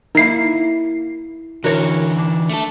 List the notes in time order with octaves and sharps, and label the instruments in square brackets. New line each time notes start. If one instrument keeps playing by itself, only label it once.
[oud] A#3 E4 [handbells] D#4 C7
[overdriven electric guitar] D3 E3 [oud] F#4 A#4 C#5
[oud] D4
[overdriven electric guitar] A3 A4